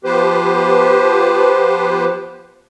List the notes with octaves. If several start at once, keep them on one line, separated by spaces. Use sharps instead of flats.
F3 B3 G4 B4 C5